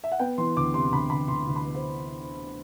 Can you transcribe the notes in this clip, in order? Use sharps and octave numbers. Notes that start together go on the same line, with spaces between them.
E5
F#5
B3 G5
E3 C6
D2 D6
C3 C6
D2 B5
D2 B5
D2 C6
D2
B5
B3
C5